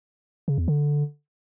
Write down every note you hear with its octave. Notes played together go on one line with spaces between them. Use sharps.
C#3
E2
D3